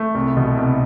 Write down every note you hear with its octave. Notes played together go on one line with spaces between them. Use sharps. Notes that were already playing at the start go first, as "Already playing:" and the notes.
Already playing: A3
C2
B2
C2